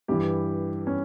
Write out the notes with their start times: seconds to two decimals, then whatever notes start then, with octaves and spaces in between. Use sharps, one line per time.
0.08 G2 E3 G4
0.87 C#4